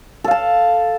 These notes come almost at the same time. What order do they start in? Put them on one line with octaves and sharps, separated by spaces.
A4 F5 A5